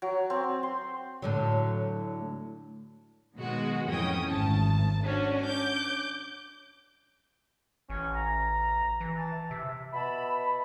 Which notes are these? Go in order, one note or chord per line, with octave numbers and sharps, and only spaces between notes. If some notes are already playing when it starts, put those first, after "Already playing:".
F#3
C4
C6
A2 D3 F#3
B2 D#3 F#3 G#3 F#4
F2 A2 E3 C#4 G5 D#6
G#1 A5
C#4 D4 F#4
D6 G6
A1 C#4
A#5
E3
A5
C3 E5
B2 E5 A5 B5